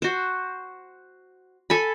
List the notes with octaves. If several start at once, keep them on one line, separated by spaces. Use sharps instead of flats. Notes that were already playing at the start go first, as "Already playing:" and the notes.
F#4 C5
A4 G#5 B5